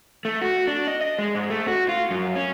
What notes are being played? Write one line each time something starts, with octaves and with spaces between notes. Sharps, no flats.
A3
F#4
D4
D#5
D#5
G#3
G#2
A3
F#4
F4
F#2
C#4